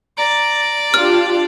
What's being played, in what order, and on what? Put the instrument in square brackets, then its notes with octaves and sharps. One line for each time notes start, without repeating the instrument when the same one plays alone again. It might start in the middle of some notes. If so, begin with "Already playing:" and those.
[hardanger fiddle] D5 [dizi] A#5
[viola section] D4 F4 G4 [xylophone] F6